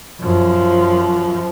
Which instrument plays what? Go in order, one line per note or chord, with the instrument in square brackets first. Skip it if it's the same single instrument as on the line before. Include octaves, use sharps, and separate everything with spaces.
[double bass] F#2 F3